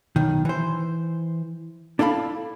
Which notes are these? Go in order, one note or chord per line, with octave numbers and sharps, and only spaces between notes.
B1 D#3
E3 C5
D4 E4 A4 F5 B5